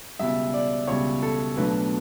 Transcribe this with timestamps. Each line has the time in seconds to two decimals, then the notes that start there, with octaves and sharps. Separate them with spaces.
0.19 C#2 B2 G3 E5
0.54 D5
0.88 C#2 B2 G3 C#5
1.23 A4
1.57 B1 B2 F#3 A3 D4 B4